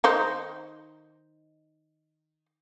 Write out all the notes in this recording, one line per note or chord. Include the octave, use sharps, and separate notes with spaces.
D#3 D#4 C5